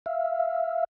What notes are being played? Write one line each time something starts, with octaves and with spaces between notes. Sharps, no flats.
E5 F5